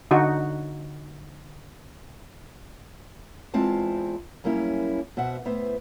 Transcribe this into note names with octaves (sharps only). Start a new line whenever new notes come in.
D3 D#4 F#4
E2 G#3 C4 E4 F4 A5
F#2 G3 A#3 C#4 E4
B2 C5 E5 F#5
A2 B3 C5 E5